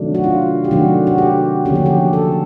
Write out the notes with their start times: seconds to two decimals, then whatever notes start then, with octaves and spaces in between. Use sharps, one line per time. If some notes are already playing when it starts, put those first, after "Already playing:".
Already playing: C3 D#3 F#3 A3 D4
0.15 F#4
0.24 F4
0.64 G4
0.71 C3 D#3 F#3 A3 D4 F#4
1.07 F#4
1.18 G4
1.65 D3 F3 A#3 C#4 G4
1.75 F#4
1.86 G4
2.13 A4